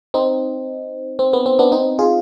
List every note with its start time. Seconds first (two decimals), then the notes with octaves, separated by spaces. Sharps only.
0.14 C4 D#4
1.19 C4
1.33 B3
1.46 C4
1.59 B3 D4
1.72 C4 D#4
1.99 F4 G#4